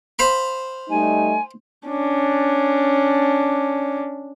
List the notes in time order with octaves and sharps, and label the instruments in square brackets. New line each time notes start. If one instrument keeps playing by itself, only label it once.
[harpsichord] C5 F5 B5
[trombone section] G3 A3 D#4 [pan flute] G#5
[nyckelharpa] C#4 D4